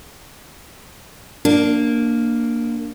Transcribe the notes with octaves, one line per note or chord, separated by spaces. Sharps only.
A#3 D4